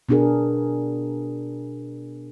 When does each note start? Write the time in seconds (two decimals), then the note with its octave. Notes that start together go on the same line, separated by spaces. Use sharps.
0.09 B2 B3 D4 F#4 G#4 A#4